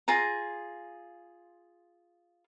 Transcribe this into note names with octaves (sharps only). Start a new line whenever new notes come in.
F4 G#4 A#5